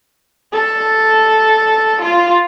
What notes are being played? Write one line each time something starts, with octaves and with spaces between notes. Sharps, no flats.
A4
F4